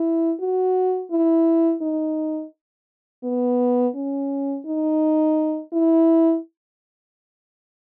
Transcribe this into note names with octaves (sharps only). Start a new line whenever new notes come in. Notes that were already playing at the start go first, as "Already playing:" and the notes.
Already playing: E4
F#4
E4
D#4
B3
C#4
D#4
E4